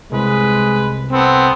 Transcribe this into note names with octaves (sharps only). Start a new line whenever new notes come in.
C2 G#3 B4
B3 C4 A4